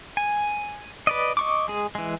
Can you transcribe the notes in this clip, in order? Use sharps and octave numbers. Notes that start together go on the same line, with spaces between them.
G#5
B4 D5 D#5
D#5 C#6 D6
G#3 G#4
E3 G#3